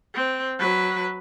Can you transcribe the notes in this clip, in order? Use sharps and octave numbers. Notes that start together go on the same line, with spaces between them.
C4
F#3 B4